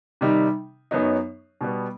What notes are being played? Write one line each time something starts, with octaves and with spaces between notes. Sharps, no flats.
C3 D#3 G3 D#4
F#2 F#3 B3 D#4
B2 G3 B3